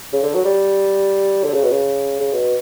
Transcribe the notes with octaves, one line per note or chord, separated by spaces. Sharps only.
C#3
D3
F#3
G3
D3
C#3
B2
C#3
C#3
B2